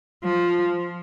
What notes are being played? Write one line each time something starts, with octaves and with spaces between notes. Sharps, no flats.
F3